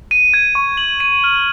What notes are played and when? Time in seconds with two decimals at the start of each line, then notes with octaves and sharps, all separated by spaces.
0.11 D#7
0.34 G#6
0.55 C#6
0.77 F#7
1.00 D#7
1.24 F6